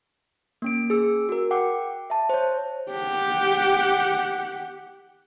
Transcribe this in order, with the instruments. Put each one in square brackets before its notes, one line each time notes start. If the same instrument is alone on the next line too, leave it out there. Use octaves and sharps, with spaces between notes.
[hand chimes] A#3 C#4 D7
G#4 E6
F#4 A#4
F#5 G5 D6
E5 A5
C5 C#5
[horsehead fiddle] G4 F#5